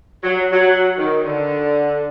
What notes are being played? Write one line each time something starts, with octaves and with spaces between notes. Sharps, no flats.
F#3
F#3
D#3
D3